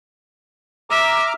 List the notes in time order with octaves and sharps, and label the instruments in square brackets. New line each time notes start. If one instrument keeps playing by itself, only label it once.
[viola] E5 [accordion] A#5 D6 F6